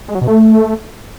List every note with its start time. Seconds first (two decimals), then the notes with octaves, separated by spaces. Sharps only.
0.08 G#3
0.15 F#3
0.21 B2
0.28 A3